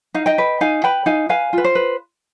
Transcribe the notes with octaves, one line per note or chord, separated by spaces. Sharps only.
D#4 F5
D#5 G5
B4
D#4 F5 G#5
B4 G5 B5
D#4 F5 G#5
B4 F5 G#5
F4 B4
C5
B4